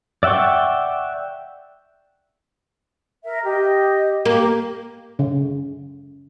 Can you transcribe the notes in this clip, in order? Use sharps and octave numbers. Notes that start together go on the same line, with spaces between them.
D5 E5 F#5 G5 C#6
A#4 E5
G4 D#5
A#3 G4
C#3